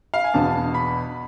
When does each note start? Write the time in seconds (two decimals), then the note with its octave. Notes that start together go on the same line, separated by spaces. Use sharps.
0.14 F5
0.24 G#5
0.34 E2 B2 B3 D4 A5
0.74 B5